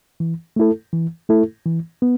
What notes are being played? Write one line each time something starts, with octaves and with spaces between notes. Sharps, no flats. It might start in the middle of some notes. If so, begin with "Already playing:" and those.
E3
A3 E4 A4
E3
A3 E4 A4
E3
B3